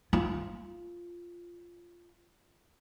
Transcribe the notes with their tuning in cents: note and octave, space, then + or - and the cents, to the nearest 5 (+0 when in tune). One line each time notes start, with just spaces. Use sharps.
F4 -5